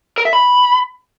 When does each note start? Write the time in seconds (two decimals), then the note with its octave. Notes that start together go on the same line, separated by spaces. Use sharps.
0.18 A#4
0.25 E5
0.33 B5